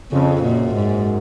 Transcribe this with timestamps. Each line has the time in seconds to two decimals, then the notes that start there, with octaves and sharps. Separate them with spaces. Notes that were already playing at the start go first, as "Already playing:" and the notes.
0.11 F2 C#3
0.43 F#2 A#2
0.75 G#2